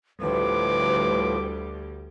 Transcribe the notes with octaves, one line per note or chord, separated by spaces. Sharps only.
D2 A2 F3 G3 B4 D6